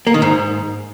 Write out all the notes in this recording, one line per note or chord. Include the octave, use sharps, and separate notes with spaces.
A#3
D#3
G#2